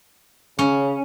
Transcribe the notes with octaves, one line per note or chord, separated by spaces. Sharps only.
C#3 C#4